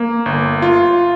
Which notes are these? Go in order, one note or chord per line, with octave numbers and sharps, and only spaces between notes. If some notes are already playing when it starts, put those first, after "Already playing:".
Already playing: A#3
G1
F4